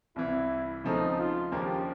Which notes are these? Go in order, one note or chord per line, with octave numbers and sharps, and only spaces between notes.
C2 C3 E3 E4
C#2 C#3 F3 A3 C4 D#4
F4
D#2 C#3 F3 A#3 D4 G4